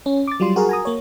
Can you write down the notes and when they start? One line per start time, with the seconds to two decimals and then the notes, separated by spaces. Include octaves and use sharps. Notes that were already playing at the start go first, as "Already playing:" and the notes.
0.06 C#4
0.28 D6 A6
0.40 F#3 G3 F4 C6
0.56 F#4 G#4 A#4
0.69 G#5 A#5 D#6
0.85 A#3 C#5